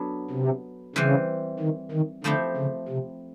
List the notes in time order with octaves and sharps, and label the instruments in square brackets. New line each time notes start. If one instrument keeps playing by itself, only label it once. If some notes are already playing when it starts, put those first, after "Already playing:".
Already playing: [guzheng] F#3 B3 D4 A4
[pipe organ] C3
[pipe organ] C#3 [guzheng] E3 G3 C4
[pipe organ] D#3
D#3
[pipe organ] D3 [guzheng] F3 A3 C4 E4 G4
[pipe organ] C#3
C3